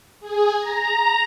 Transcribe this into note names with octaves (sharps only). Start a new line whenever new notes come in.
G#4
A#5